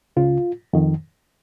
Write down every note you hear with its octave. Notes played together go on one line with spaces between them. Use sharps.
C#2 C#3 F4
F2 D#3